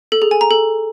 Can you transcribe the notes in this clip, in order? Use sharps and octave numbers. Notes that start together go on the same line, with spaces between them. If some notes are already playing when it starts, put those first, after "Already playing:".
A4
G#4
G#5
A#5
A4